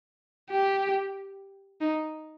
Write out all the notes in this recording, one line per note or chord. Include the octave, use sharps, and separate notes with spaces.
G4
D#4